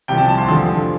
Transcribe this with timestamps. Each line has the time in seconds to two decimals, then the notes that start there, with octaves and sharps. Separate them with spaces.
0.08 C2 C3 F3 G5
0.18 A5
0.29 A5
0.38 C6
0.47 F1 E2 D3 F3